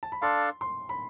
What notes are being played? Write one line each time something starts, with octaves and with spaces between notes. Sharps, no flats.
A5
B5
D4 A4 D5 F5 C6
C6
B5